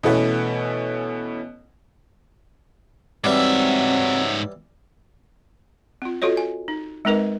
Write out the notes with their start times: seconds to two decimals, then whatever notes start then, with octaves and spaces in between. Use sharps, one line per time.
0.03 B2 E3 A3 B3 C#4
3.24 G#2 E3 F#3 G3 C4 E5 D6
6.02 C4 F4
6.22 F4 F#4 A4 C#5 D#5
6.37 G#5
6.68 D#4
7.05 G#3 C4 D#4 A#4 B4 D#5